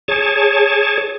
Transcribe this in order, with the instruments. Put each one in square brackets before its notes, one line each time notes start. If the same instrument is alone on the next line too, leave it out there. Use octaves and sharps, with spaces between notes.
[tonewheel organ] G#4 C#5 A5